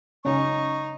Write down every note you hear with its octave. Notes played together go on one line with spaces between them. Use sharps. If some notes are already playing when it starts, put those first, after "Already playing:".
C#3 C#4 D#4 C#6